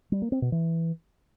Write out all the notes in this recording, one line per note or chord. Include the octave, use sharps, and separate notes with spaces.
G3
A#3
C4
B2
E3